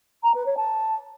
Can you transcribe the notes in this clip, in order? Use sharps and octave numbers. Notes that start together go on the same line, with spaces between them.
A#5
B4
C#5
A5